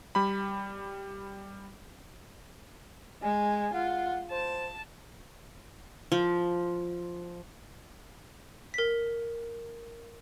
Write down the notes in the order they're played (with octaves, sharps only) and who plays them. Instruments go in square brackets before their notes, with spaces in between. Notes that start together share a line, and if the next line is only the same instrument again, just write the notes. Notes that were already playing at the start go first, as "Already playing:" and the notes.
[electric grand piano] G3 B5
[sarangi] G#3 [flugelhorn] G#5
[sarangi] F4 [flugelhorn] F#5
[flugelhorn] C5 [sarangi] A5
[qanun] F3
[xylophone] A#4 B6